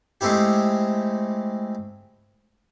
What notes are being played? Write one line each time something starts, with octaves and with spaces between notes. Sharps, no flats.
G#3 A3 C4 E4 G4